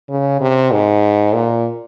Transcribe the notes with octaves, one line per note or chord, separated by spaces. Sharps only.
C#3
C3
G#2
A#2